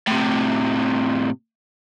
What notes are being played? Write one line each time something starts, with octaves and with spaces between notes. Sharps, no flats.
A2 C3